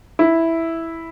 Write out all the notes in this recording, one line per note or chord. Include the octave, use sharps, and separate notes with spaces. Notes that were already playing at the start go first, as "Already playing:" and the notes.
E4